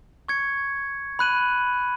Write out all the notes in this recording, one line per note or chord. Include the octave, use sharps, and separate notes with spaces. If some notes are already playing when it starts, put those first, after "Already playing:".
C#6 G#6 C#7
B5 F#6 D#7 F#7